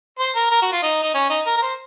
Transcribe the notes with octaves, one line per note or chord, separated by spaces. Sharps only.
C5
A#4
A#4
F#4
F4
D#4
D#4
C#4
D#4
A#4
A#4
C5